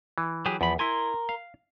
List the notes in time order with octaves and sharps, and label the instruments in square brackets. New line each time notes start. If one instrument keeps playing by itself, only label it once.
[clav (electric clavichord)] E3
[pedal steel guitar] F#3 G4 G#4
[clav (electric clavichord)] E2 [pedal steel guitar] F3 B5
[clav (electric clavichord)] E4 G#5 [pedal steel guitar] A#4 C6
[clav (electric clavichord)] F5